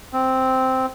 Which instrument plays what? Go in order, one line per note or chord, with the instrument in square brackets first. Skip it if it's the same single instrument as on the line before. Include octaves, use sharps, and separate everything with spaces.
[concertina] C4